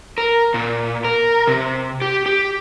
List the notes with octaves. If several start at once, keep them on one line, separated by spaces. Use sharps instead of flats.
A#4
A#2
A#4
C3
G4
G4